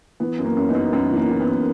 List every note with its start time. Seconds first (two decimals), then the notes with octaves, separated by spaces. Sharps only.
0.20 E3 B3
0.38 F#2
0.44 A#3 C#4
0.57 F#2
0.69 B3 D#4
0.75 F#2
0.93 F#2 B3
1.11 E3
1.16 A#3
1.28 E3
1.40 B3
1.47 F#2